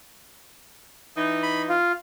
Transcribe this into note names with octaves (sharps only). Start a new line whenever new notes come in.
E3 D#4
B5
F4